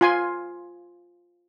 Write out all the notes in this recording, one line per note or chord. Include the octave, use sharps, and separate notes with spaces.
F4 G#5 C6